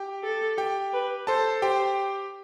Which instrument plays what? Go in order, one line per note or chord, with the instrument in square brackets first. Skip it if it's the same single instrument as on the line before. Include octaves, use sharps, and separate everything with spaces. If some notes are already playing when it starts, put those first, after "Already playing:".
Already playing: [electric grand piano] G4 G5
[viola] A4
[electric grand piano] G4 G5
[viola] B4
[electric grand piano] A4 A5 [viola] C5
[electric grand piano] G4 G5 [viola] C5